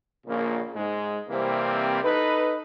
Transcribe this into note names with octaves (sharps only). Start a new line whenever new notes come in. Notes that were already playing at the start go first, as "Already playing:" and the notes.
A#1 A#2 C#3 A#3
G#2 G#3
C3 E3 G3 A#3 C4
D#4 A4 B4